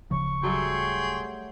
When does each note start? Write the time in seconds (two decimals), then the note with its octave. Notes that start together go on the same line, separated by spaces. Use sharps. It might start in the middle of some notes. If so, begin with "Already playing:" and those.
0.11 D1 C#3 F3 C#6
0.43 F#3 G3 A3 G#4 G5 C6